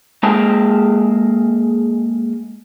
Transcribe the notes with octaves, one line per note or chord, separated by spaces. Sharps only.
G#3 A#3 G#4 G5 A5 A#5